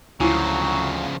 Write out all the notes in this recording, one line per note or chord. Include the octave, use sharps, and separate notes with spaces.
D2 C#3 F3 F#3 E4 F4 G#5